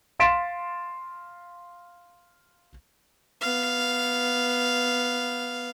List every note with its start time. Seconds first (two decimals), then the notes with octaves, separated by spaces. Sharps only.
0.19 F5 C6 A6 B6 D7 E7
3.41 B3 F5